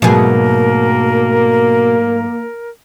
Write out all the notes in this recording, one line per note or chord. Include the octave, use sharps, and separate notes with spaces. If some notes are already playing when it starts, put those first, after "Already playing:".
G#2 B2 F#3 A3 A#3 G#4 A#4